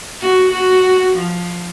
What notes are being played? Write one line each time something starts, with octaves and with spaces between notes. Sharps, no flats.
F#4
F#4
F3